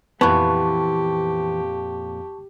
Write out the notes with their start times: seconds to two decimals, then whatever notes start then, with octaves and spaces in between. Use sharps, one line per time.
0.21 F2 A#2 E3 B3 G4 A5 C#6